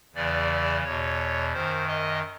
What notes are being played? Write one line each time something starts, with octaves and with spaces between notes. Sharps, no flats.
E2 C#3 E3 D5
E2 B2 C#5
F#2 D#3 C5
D#5